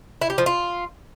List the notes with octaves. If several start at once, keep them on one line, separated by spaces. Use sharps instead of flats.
E4
G4
F3
F4